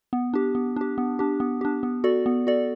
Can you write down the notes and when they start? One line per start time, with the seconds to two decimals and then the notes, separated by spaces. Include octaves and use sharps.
0.13 B3
0.34 D4 G4
0.55 B3
0.76 D4 G4
0.98 B3
1.19 D4 G4
1.40 B3
1.61 D4 G4
1.83 B3
2.04 F#4 A4 D5
2.26 B3
2.47 F#4 A4 D5